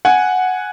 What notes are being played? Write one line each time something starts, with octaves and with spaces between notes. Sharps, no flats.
F#5 G#5